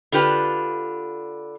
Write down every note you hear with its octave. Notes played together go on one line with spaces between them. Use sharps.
D3 F4 G4 B4